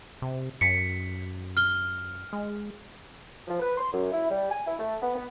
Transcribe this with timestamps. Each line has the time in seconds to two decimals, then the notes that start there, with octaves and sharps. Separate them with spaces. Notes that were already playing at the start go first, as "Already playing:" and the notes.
0.22 C3
0.61 F#2 B6 C#7
1.57 F6 G7
2.33 G#3
3.48 F3
3.60 B4
3.78 C6
3.92 F#2
4.11 E4
4.30 G3
4.51 G#5
4.67 E4
4.79 A3
5.01 B3
5.15 B3